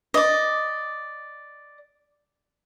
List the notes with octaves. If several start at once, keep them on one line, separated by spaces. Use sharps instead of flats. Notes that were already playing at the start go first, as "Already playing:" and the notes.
D5 D#5